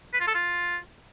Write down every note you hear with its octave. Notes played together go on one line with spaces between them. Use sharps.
B4
F4
A4
F4